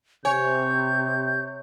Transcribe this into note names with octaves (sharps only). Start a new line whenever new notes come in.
C3 C#5 G#5 G6